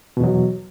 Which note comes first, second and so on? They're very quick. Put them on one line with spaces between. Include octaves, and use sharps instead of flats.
B2 E2 F#3